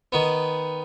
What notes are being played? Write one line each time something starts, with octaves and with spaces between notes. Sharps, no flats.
D#3 B3